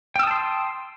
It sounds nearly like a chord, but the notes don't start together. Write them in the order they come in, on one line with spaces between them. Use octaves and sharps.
G5 E6 D#6 A5 C6